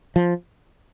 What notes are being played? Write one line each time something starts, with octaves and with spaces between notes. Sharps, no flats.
F3